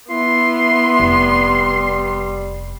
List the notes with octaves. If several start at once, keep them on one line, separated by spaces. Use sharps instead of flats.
B3 E4 C6
F1 G3